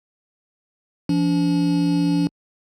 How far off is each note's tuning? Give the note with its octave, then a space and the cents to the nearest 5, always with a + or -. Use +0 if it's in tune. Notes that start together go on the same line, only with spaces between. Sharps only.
F3 -35 D4 -40